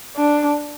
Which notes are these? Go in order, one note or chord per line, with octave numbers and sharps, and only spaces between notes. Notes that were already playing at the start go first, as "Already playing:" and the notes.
D4